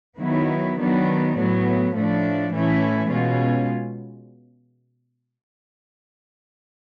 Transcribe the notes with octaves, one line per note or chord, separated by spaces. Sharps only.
D#3 F#3 B3 E4
D#3 F#3 B3 D4
A2 F#3 B3
A2 F3 A3 D4
A2 E3 A3 C#4 E4
B2 G#3 C#4 F4